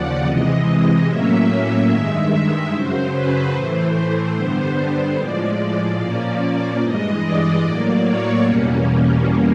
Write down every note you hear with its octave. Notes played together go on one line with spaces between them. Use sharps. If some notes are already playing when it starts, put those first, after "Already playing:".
Already playing: D#2 C#3 F3 D5 F#5
C3 E3 G#3 D#5
A2 F#3 A#3 C#4 E5
G2 D#3 G#3
F#2 C#3 F#3 C5
B4
A2 E3 A3 C5
G2 D3 G3 B3
A2 F3 G#3 D5
A#2 F3 A#3 C#4
G2 E3 G#3 D#5
D5
A2 F#3 A#3 D5
C#5
E2 B2 G3 A#3 C#4